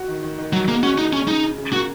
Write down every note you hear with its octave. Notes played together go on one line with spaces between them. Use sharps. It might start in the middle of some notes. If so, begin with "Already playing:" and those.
Already playing: F#4
D#3
D#3
D#3
F#3 F#4
G#3 A#3
C#4 F#4
G#3 D#4
C#3 C#4
C#3 D#4
C#3
C#3
A#3 F#4